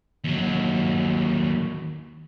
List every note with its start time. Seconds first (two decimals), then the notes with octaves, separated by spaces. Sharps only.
0.24 D#2 F#3